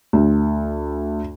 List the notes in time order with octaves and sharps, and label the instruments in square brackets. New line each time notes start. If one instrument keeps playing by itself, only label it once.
[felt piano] D2